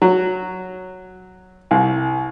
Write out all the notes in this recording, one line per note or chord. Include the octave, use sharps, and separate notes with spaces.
F#3
C2